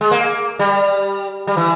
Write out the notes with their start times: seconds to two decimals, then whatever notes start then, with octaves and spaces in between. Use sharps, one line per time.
0.01 G#3
0.11 A#3
0.59 G3
1.47 G3
1.57 E3